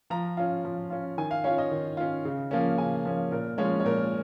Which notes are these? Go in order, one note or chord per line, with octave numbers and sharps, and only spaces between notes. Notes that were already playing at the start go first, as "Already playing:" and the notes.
F3 A#5
C#4 F4
F3
C#4 F4
D#3 G#5
F5
C#4 F4 C#5
D#5
D#3
C#4 F4
C#3
F3 A#3 C#4
C#3 G#5
F3 A#3 C#4
A#2 A#4
F3 G#3 C#4 C#5
C#5
A#2 A#4